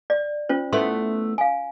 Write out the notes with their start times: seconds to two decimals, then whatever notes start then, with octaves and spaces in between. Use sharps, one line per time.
0.10 D5
0.49 C#4 F4 C5
0.73 A3 B3 E4 C6
1.38 F5 G#5